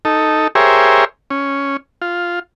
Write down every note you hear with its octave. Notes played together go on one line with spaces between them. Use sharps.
D#4 A4
G4 G#4 A#4 C5 C#5 E5
C#4
F4